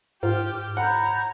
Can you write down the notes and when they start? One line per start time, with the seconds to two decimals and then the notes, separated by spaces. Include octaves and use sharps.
0.23 G#2 F4 G4 F6
0.77 C#5 F#5 A#5 B5 G6